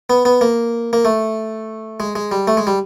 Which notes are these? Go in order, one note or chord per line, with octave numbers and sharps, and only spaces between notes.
B3
B3
A#3
A#3
A3
G#3
G#3
G3
A3
G#3
G3